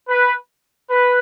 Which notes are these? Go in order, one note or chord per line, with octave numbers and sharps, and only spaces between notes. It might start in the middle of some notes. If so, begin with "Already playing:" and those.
B4
B4